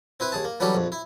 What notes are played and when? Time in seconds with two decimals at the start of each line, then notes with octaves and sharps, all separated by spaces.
0.20 C4 E4 B4
0.32 D#2 G#4 A5
0.45 A#3
0.60 E3 F#3 G3 C#4 G4 A4
0.74 A#1 F2
0.92 E4